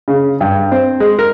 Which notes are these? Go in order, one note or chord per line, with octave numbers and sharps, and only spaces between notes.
C#3
G2
C4
G#3
A#4